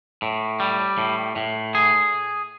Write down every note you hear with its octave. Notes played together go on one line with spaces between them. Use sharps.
A2
G3
A2
A2
G#4